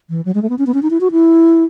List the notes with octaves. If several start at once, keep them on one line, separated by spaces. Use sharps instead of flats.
E3
F#3
G#3
A3
B3
C#4
B3
C#4
D#4
E4
F#4
E4